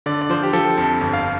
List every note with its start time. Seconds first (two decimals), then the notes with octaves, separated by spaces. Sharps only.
0.06 D3 D5
0.22 D5
0.30 F3 C5
0.43 G4
0.53 F3 A4
0.78 F2 A4
1.01 G1
1.13 F5